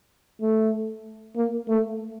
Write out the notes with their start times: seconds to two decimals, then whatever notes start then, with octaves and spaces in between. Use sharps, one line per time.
0.41 A3
1.36 A#3
1.68 A3